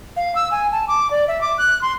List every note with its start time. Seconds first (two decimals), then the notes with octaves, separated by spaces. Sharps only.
0.16 F5
0.35 E6
0.51 G#5
0.72 A5
0.88 D6
1.11 D5
1.28 E5
1.41 D6
1.58 F#6
1.82 C6